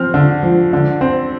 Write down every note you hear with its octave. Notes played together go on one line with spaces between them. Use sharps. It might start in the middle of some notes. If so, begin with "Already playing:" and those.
Already playing: F3 C4 F6
D3
F3
D3
C4